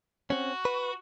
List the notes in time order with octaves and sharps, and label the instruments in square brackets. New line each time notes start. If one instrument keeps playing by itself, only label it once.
[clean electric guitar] C4 C#4 [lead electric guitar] F#4
[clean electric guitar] B4